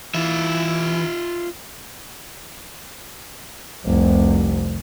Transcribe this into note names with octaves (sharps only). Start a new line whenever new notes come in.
E3 F4 E5
F1 C2